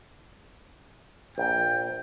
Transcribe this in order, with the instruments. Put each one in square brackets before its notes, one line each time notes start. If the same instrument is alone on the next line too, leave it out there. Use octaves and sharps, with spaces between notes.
[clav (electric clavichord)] A#1 [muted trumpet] G5